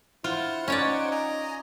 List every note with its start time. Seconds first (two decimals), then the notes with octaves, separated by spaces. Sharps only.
0.24 E4 F4 C5 F#5
0.68 C#4 D#4 C#5 D5
1.12 D#5 G#5 A#5